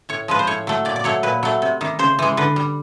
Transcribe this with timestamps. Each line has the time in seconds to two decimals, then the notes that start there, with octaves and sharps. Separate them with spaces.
0.09 A2 C#5
0.28 F3 G#3 B4
0.39 C5
0.47 A2 C#5
0.67 F#3 A3
0.85 A#2 D5
0.96 D5
1.04 F#3 A3 C#5
1.23 A#2 B4
1.43 F#3 A3
1.62 C3
1.81 D#3 G3
1.99 C#3 C5
2.19 E3 G#3
2.37 D3 B4
2.56 G3